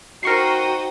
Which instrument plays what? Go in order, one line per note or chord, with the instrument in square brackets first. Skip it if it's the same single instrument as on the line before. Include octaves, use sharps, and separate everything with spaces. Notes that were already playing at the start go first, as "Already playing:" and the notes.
[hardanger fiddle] D#4 C5 [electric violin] F#4 [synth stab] A#4 C#6 C7 [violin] G5 D#6